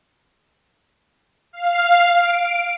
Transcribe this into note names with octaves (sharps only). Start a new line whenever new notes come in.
F5
D7